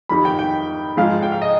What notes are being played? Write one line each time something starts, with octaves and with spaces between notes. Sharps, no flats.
F2 D#3 G3 B5
G5
G5
G#2 F3 G#3 F5
G5
F5
D#5